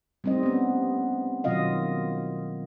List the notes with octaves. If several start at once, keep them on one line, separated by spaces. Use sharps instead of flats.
G3 A3 C4 D#4 D#5
B3 C#4
B2 D#3 F#3 F4 D#5 F5